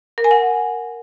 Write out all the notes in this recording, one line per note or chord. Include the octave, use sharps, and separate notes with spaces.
A#4
G#5
F#5